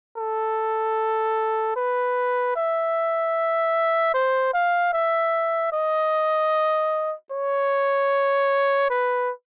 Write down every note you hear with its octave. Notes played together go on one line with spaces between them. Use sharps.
A4
B4
E5
C5
F5
E5
D#5
C#5
B4